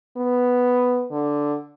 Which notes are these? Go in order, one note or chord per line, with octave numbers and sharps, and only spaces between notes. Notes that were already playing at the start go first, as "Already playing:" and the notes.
B3
D3